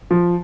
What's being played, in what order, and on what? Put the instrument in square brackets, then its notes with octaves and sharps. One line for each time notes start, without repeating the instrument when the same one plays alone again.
[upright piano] F3